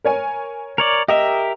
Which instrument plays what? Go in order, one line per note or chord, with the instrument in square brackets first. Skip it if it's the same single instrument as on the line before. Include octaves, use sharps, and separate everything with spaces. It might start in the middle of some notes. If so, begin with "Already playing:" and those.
[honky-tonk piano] A#4 C#5 G#5
[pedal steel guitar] A#4 C#5 D5
[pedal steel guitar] G4 A#4 E5 [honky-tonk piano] D#5